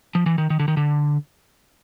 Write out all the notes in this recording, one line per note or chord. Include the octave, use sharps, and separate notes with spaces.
F3
E3
D#3
D#3
D3
D#3
D3